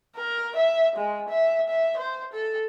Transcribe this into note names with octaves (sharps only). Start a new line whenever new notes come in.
A#4
E5
G#3
E5
E5
C5
A4